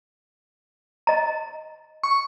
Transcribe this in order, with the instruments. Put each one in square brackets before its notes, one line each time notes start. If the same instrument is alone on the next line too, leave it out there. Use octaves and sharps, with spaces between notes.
[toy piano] D#5 A#5
[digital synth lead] C#6